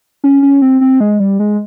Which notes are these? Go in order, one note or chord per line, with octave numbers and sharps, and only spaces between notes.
C#4
C#4
C4
C4
G#3
G3
G#3